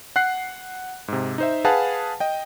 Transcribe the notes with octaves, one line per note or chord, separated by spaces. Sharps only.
F#5 F#6 C7
G#2 C3
D#4 C5 E5
G#4 B4 F5 F#5 G#5 A5
D#5 G5